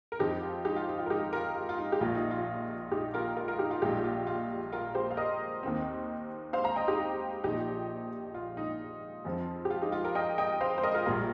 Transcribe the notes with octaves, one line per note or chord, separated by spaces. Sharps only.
A#4
F2 F3 C4 D#4 G4
F4
D#4 G4
F4
D#4
F4
A#4
D#4 G4
F4 A#4
F4
F4
D#4
G4
A#1 A#2 A#3 F4
D#4
F4
D#4 G4
F4 A#4
F4 A#4
F4 A#4
D#4 G4
F4
A#1 A#2 G3 A#3 D#4 G4
F4
F4
F4 A#4
G4 C5
F5
A#4 D#5
D#2 D#3 C4
C5 F5
F5 A#5
D#5 G5
D#4 G4
A#1 A#2 F3 D#4 G4
F4
D#4
F2 F3 C4
G4
F4
D#4 G4
F4
F4 A#4
D#5 G5
D#5 G5
C5 F5
C5
A#4 D#5
F4 A#4
A#1 A#2 G3 A#3 F4 A#4